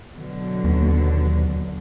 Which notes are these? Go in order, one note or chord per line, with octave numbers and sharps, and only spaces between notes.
B2 D3 F#3
D#2